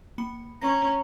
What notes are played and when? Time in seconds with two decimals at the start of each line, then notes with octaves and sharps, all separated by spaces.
0.18 A#3 B5 C#7
0.61 C#4 A#5 C#6 A#6